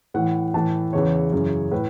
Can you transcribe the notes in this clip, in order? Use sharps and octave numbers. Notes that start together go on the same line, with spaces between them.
A2 E3 F#5
A2 E3 A5
E2 C#3 E3 C#5
F#2 C#3 E3
A2 B4